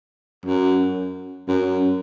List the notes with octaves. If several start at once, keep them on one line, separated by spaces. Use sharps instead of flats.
F#2
F#2